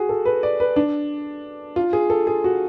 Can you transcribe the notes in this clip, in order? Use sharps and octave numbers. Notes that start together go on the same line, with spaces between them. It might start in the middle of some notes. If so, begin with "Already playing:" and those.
Already playing: F#4 G#4
A4
B4
D5
B4
D4
F4
G#4
A4
G#4
F#4